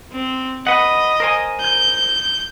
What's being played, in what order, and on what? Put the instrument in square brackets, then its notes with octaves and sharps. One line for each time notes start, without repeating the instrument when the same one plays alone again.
[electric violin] C4
[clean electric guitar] B4 F#5 [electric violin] D#5
[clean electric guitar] A#4 C5 G#5
[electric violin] G6